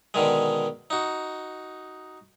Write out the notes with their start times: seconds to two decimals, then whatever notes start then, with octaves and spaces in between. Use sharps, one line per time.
0.14 B2 D3 D#3 G#3
0.90 D#4 F#4